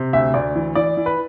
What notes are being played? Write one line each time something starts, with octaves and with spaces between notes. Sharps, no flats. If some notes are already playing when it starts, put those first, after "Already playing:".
Already playing: C3
D2 E5
D2 D5
E3
E3 D5
E3
B4